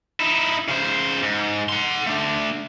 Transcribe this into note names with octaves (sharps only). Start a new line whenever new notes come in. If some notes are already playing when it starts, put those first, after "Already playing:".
D#4 E4
C#3 C5
G#2
F#5 C6
A3 D4